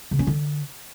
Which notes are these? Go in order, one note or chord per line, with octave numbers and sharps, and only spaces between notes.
C#3
C#4
D3